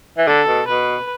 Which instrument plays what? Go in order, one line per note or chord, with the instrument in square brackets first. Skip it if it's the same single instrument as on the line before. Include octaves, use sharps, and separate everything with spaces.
[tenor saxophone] E3
[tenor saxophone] D3 [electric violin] A4
[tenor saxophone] B2
[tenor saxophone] B2 [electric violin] B4